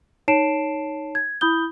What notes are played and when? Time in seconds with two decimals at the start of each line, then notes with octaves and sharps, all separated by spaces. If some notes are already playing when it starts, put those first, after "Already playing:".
0.28 D#4 C#5 A5 C7 D7 E7
1.15 G#6
1.41 E4 B5 D#6 G6 G7